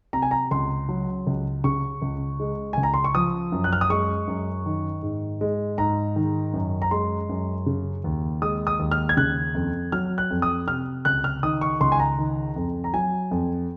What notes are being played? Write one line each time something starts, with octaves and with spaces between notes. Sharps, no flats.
C3 A#5
G#5
A#5
C#2 C6
F#3
C#2
C#3 C#6
C#2
G#3
C#2 G#5
A#5
C6
C#6
F3 D#6
F#2
F#6
F6
D#6
G#3 C#6
F#2
D#3
G#2
G#3
G#2 A#5
D#3
F#2
A#5
G#3 C6
F#2
C#3
D#2
G#3 D#6
D#6
D#2
F6
G#6
C#3 F#6
F2
F#3 F6
F#6
F2
D#6
C3 F6
C#2 F#6
F6
D#3 D#6
C#6
C#2 C6
G#5
A#5
D#3
F2
A#5
F#3 G#5
F2